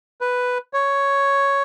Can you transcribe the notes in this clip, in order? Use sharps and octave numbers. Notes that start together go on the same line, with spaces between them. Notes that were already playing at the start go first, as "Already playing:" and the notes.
B4
C#5